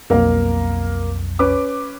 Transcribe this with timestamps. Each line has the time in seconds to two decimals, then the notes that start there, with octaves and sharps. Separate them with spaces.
0.10 B1 F2 A#3 A#4 F5
1.39 C#4 B4 D6